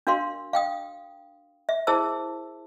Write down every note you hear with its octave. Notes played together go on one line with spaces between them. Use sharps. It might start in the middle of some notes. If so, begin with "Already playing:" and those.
D4 F#4 A#4 F5 C6
F5 G5 D#6
E5
E4 G#4 A#4 C5 A5 E6